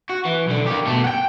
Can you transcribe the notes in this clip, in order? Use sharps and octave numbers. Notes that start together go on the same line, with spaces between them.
F#4
E3
B1 D3
A#3 G4
B2 A3
F#5 G5